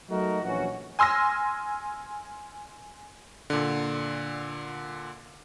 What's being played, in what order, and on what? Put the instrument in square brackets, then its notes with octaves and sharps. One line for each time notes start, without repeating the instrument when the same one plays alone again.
[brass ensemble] F#3 A3 D#4 F#4 A#4
A#1 E3 C#4 F#4
[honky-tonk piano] G#5 C6 E6 F6 A#6
[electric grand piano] A#2 D3